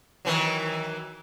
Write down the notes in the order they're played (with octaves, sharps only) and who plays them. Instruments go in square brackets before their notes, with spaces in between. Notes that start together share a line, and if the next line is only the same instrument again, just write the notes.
[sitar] D#3 E3 F#3